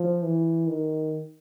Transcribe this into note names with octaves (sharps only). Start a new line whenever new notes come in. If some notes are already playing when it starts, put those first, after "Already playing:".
Already playing: F3
E3
D#3